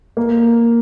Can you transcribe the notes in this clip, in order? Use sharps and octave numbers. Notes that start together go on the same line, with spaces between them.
A#3